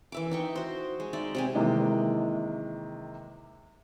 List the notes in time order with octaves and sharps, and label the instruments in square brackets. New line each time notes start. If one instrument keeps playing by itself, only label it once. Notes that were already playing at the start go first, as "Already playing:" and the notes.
[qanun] E3 E5 D6
D#4 G5 C#6
F#4 C5
G#3
D#4 D5 E5
C3 G5 G#5
[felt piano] C3 D#3 E3 G#3 A#3